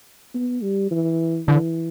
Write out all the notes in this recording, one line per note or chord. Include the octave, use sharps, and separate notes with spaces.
B3
G3
E3
D3 E3